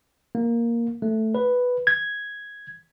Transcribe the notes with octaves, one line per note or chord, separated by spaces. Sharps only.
A#3
A3
B4
G#6